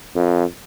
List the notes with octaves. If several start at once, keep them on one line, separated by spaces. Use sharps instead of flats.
F2